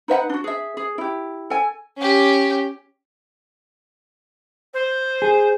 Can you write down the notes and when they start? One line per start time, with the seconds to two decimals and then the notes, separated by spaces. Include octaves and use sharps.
0.08 D#4 B4 E5 F#5
0.29 D4 F#4
0.44 G#4 E5
0.77 G#4
0.98 E4 G4
1.50 A4 G#5
1.97 C#4 G4
4.73 C5
5.22 G#4